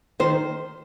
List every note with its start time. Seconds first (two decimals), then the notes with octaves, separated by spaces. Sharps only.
0.20 D#3 C5